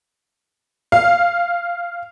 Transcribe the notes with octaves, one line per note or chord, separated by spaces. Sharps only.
F5